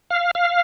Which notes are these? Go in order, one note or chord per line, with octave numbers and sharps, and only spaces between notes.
F5
F5